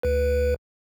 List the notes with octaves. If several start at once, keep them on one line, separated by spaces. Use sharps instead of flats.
D2 B4